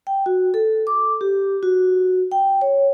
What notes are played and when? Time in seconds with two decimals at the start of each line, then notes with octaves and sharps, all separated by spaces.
0.07 G5
0.26 F#4
0.54 A4
0.87 D6
1.21 G4
1.63 F#4
2.32 G5
2.61 C#5